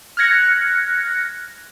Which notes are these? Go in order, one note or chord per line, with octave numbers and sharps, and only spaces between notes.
F6 F#6 G#6 A#6 C#7